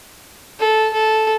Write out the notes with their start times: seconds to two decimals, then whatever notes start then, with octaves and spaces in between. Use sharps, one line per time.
0.59 A4
0.93 A4